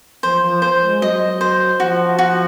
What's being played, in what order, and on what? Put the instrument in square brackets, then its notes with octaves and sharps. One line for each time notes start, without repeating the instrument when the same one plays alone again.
[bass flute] F3 [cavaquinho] C5
[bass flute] F3
[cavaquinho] C5
[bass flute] G#3
[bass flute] F#3 [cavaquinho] D#5
[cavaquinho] C5
[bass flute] F3 [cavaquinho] F#4
[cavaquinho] F#4